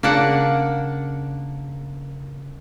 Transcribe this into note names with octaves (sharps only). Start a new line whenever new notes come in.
C#3 A#3 D4 F#5